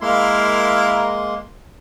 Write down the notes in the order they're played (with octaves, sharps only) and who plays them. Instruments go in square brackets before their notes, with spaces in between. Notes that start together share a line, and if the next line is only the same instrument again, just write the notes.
[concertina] G#3 A#3 C6 [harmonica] E4 A#4 F5